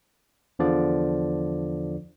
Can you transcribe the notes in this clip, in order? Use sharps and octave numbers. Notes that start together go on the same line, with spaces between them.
E2 D3 F3 D5